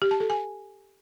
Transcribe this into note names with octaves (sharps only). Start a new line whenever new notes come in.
G4
A5
A4
G#5